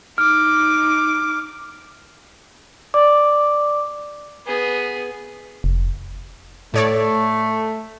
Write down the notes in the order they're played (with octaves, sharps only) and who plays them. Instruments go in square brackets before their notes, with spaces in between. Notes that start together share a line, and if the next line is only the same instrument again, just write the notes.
[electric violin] D#4 D6 [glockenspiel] F6
[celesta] D5 [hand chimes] D6
[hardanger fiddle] B3 G#4
[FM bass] F1
[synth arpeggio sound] A2 C#5 D5 [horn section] A3